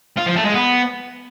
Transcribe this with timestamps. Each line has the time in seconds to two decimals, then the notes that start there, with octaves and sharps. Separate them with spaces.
0.17 F4
0.26 F3
0.36 A3
0.45 G#3
0.54 B3